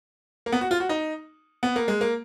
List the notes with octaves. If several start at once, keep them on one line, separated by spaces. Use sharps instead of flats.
A#3
B3
F#4
F4
F#4
D#4
B3
A#3
G#3
A#3